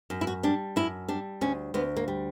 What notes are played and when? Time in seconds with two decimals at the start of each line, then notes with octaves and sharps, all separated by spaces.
0.10 F#2
0.21 E4
0.27 F#4
0.43 G3 D4
0.76 F#2 E4
1.08 G3 D4
1.41 D2 C#4
1.74 D2 B3
1.97 A#3
2.08 G3